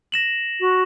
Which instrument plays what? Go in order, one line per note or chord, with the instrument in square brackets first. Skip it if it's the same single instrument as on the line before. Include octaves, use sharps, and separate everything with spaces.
[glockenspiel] A#6 E7 F#7
[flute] F#4